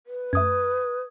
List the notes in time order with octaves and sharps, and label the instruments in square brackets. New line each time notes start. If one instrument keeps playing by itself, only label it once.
[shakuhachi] B4
[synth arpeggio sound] F#2 A3 [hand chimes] D#6 G#6